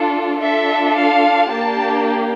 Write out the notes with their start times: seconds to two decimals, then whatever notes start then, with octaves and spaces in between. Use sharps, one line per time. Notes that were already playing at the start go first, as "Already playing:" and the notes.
Already playing: D4 F4 A4
0.40 D4 F4 A4 E5
0.95 F5
1.51 A#3 D4 G4 A5